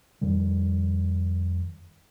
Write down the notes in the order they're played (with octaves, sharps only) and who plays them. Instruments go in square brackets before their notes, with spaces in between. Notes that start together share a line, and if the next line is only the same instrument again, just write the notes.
[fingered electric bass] F2 D#3 G3